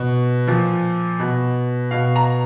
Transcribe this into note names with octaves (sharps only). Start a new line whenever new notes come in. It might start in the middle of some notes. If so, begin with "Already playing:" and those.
Already playing: B2
A#2 F3
B2
B2 F5
A#5